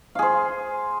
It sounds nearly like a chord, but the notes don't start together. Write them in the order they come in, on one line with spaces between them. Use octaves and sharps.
F5 G#4 C5